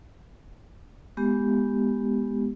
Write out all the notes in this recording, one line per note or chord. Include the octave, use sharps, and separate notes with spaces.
G#3 B3 G4